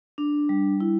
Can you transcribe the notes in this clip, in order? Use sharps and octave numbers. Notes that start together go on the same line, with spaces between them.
D4
G3
E4